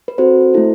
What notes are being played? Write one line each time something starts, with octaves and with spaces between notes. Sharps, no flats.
B4
C4 F#4 A4 C5
A3 E4 A4